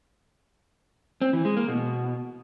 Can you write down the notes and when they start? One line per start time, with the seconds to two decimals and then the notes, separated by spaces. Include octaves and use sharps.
1.21 C4
1.33 E3
1.45 G#3
1.57 A#3
1.68 B2